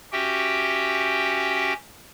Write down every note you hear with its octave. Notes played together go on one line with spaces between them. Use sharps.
C#4 F#4 G4 E5 G5